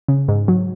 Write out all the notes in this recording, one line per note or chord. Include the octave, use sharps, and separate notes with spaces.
C#3
G#2
F#3